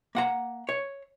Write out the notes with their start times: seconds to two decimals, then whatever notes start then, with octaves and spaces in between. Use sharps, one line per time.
0.15 A#3 F#5 A#5
0.69 C#5